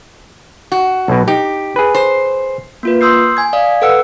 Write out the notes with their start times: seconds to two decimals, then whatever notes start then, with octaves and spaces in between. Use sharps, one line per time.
0.72 F#4
1.08 B1 B2
1.28 D#4 G4
1.76 G#4 B4
1.95 C5
2.83 A#3 F4 B4
3.01 C6 D#6 E6 G6 C7
3.37 G#5 G#6
3.53 D5 F5 D#6
3.82 A4 B4 F#5 E6 C#7